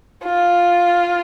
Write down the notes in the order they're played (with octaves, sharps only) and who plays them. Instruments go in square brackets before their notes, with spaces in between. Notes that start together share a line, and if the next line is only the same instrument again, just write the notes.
[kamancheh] F4